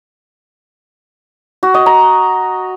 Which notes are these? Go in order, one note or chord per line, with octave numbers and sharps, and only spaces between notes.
F#4
D#5
A#5